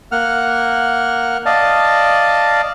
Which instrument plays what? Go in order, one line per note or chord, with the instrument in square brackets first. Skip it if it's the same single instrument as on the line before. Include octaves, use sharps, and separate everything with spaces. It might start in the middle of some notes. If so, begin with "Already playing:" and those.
[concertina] A#3 F#5 F6
D5 D#5 F5 A5